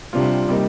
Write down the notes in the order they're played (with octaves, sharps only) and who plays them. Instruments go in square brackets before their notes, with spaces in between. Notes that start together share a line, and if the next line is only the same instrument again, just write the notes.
[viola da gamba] C3 [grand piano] G3 D4 F4
[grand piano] G3 A#3 D#4